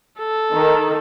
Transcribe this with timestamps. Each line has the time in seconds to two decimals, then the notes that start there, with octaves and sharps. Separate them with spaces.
0.19 A4
0.53 D#3